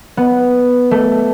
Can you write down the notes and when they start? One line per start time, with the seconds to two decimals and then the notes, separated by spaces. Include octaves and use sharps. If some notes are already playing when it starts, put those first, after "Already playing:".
0.17 B3
0.91 A3